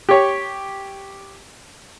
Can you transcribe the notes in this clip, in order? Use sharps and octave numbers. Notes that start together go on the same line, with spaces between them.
G4 C#5